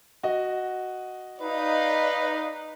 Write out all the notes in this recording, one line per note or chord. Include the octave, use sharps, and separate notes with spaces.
F#4 D#5
D#4 B4 D5 F5